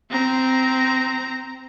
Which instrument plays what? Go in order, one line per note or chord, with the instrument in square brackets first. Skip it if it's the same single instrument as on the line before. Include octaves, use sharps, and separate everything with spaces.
[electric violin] C4 A#5